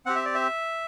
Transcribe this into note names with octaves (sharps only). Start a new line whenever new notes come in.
C4 G4 F#5
E5
D5
E5